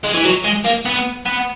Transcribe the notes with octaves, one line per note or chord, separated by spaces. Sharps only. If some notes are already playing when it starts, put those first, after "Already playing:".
G#3
E3
F#3
G#3
A#3
B3
B3